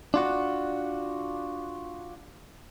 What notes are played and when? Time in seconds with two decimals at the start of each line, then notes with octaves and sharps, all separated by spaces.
0.14 D4 F4 F#4